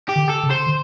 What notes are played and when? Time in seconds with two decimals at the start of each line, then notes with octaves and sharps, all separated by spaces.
0.09 G4
0.16 D3
0.29 A4
0.43 C#3
0.51 C5
0.67 D3